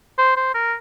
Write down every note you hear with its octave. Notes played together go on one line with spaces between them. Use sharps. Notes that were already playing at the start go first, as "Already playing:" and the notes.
C5
C5
A#4